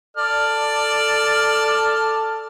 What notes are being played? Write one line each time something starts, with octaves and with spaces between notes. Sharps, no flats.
A4 D5 F6